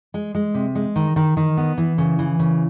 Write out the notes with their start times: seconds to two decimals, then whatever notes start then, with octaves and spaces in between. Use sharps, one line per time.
0.14 G#3
0.35 G#3
0.54 C3
0.75 G#3
0.96 D#3
1.16 D#3
1.37 D#3
1.57 B3
1.78 E3
1.98 C#3
2.19 E3
2.39 C#3